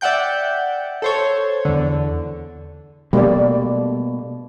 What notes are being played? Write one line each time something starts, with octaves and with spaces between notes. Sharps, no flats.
D5 E5 F#5 G5 G6
A4 C5 C#5
E2 D3
B2 G3 A3 A#3 D5